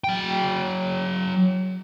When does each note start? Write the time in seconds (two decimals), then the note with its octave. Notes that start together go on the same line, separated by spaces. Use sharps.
0.04 F#3 G5